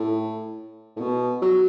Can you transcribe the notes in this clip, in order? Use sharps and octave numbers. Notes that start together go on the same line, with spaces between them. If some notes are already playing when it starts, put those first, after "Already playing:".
Already playing: A2
A2
B2
F#3